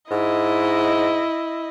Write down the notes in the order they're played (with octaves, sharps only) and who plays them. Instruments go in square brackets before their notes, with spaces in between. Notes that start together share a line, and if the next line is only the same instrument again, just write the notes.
[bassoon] G#2 [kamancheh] E4 D#5